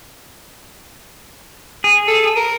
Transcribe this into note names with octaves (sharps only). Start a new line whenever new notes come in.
G#4
A4
A#4